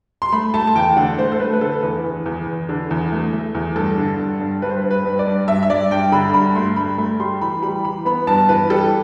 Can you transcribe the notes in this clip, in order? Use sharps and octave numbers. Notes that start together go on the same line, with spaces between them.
C6
A3 B5
A3 A5
A5
E2 G5
D3 F#5
A3 C5
A4
A3 B4
B4
D3 A4
E2 B4
E2
E2
E2
D3
E2
A3
A3
E2
G2 A4
D3
G2
G2
G2 B4
C5
B4
G2
B4
G2
D5
G2
G2 E5
E5
G2 D5
G2 G5
D3 B5
G2 B5
A3 C6
G2 B5
A3 B5
G3 C6
E3 B5
G3 B5
E3 B5
B3 B5
G2 A5
E3 B4
G3 A4